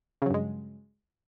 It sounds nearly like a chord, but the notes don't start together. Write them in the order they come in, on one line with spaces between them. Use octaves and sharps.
C#3 F#3 G2 G#3